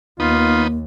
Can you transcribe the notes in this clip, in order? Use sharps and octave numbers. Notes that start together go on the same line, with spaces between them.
D#2 A#3 B3 D#4 F4